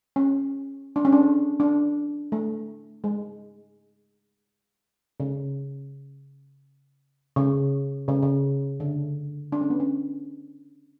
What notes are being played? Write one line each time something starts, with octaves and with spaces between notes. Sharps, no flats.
C#4
D4
C#4
D4
D4
A3
G#3
C#3
C#3
C#3
C#3
D3
D4
C#4
B3
C#4